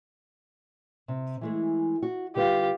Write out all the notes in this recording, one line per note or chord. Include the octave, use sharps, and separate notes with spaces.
C3
E3 G#3 A3
F#4
D3 G3 F4 G4 B4